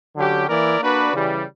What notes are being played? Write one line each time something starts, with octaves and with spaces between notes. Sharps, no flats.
D3 F#3 C#4 G4
E3 A#3 E4 A#4 D5
A#3 D4 F#4 B4 D5
C#3 E3 G3